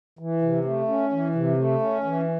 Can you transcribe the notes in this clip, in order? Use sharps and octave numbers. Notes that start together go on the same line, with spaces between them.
E3
C3
A3
C#4
E3
C3
A3
C#4
E3